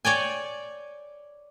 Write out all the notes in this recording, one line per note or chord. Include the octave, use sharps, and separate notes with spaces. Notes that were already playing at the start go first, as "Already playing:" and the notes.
C#5 D5 G5 G#5